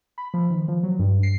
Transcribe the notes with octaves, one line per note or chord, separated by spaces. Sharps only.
B5
F3
D#3
F3
F#3
G2
C7